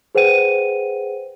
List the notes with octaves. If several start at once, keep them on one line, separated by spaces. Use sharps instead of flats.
G#4 B4 C5 F#5 G5 D#7